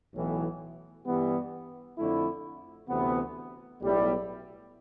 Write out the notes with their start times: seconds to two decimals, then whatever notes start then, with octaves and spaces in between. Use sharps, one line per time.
0.14 B1 A2 E3 B3
1.05 G2 E3 G3 B3
1.97 F2 D3 A3 E4
2.89 D2 C3 E3 B3
3.81 B1 A2 G3 B3 E4